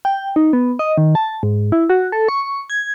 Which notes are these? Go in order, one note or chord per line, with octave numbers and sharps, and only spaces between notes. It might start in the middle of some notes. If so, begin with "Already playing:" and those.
G5
D#4
B3
D#5
D#3
A5
G#2
E4
F#4
A4
C#6
G#6